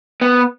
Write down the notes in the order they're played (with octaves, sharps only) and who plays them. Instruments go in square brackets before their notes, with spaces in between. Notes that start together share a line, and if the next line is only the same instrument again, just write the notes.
[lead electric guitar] B3